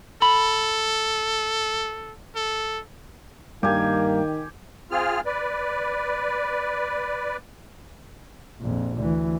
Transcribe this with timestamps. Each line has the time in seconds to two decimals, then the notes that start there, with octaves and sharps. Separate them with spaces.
0.22 A4 B5
2.36 A4
3.63 G2 D#3 A#3 G4 G#5
4.91 C4 F4 G#4 F6
5.26 B4 D5
8.61 A#1 F2
8.97 D2 E3